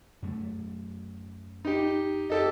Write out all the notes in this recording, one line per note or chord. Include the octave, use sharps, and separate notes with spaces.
F#2 A3
D#4 G4
G4 A4 D#5